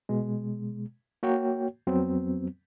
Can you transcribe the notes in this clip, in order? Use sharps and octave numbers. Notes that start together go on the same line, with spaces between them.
B2 G#3
A#3 F#4 C#5 G5
F2 F#3 B3 C4